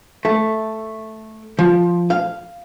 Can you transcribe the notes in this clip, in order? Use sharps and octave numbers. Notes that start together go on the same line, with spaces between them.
A3
F3
F5